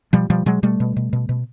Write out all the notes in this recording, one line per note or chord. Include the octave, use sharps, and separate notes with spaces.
B2 F3 G3
B2 F3 G3
B2 F#3 G#3
B2 G3 A3
B2
B2
B2
B2